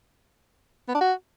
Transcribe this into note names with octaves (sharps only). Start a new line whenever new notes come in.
B3
D4
F#4